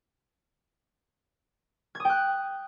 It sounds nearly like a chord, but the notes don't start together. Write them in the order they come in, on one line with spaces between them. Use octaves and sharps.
G#6 D#6 G5 F#6